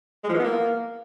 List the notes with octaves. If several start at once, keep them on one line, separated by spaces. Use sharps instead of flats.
G#3
F3
E3
B3
A#3